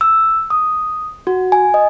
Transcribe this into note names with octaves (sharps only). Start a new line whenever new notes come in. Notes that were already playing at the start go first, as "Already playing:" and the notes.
E6
D#6
F#4
G#5
D#5